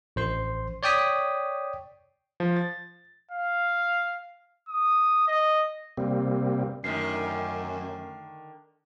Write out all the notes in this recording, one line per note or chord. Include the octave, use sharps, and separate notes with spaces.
A1 C5 C6
C#5 D5 G5 D#6 B6
F3
A6
F5
D#6
D#5
C3 G3 A#3 C4
F#2 D3 D#3 A3 A#4 C7